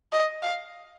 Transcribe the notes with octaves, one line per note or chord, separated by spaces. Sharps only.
D#5
F5